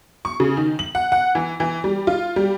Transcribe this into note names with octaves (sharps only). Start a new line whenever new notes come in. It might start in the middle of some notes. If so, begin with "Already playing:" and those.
C#6
C#3
D#3
F#7
F#5
F#5
E3
E3
G3
F4
G3